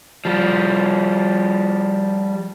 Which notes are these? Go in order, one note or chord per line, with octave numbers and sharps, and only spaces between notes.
F3 G3